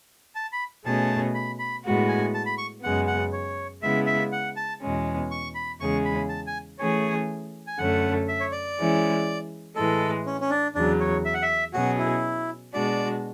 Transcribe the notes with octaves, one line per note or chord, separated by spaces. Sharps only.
A5
B5
B2 A3 C#4 G#4 A5
B5
B5
A2 G#3 B3 F#4
G#5
A5
B5
C#6
F#2 C#3 G#3 B3 F#5
F#5
C#5
C#3 G#3 B3 E4 E5
E5
F#5
A5
E2 B2 G#3 C#4
C#6
B5
E2 C#3 G#3 C#4 G#4 C#6
B5
A5
G#5
E3 A3 C#4 G#4 C#5
G#5
F#2 D3 A3 C#4 F#5
E5
C#5
D5
E3 G#3 C#4 E4
A2 E3 G#3 A4
C#4
C#4
D4
E2 C#3 F#3 D4
C#5
E5
F#5
E5
B2 F#3 C#4 F#4 G#4
E4
B2 G#3 D4 F#4 D5